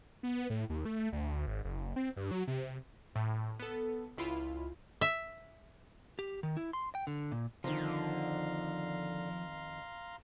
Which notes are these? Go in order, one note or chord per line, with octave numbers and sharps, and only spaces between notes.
B3
A2
D#2
A3
D2
G#1
F#1
C4
G2
F#3
C3
A2
B3 A4
C#2 E4 F4 B5
E5
G4
D#3
E4
C6
G5
D3
A#2
F2 D3 D#3 F3 F5 A#5 C6